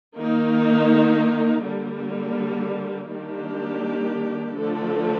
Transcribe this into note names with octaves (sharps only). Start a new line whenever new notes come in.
D#3 A#3 D#4
D3 G3 A#3
D#3 G3 A#3 D4 G4
D3 F3 A3 D4 A4